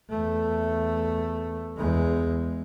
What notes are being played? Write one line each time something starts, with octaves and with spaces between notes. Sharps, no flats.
E2 A3
E2 G#3